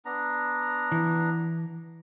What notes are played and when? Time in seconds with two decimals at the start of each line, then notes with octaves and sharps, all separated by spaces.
0.05 B3 D4 A#5
0.92 E3